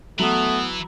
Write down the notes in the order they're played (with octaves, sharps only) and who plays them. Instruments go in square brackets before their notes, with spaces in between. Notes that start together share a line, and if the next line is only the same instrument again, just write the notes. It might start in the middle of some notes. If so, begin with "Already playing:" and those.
[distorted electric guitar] E3 [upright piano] F#3 [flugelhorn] A3 [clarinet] B3